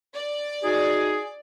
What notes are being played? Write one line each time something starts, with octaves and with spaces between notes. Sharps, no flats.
D5
D#4 F#4 G#4